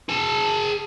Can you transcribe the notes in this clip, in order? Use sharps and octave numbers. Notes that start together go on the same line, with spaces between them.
G#4 A5